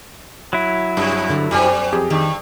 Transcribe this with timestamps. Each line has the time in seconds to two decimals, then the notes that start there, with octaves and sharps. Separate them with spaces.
0.53 F#3 E4
0.97 G2 C3
1.30 D3
1.51 F#2 B2 G3 G#5
1.92 F2 G4 G#4
2.10 G2 D#3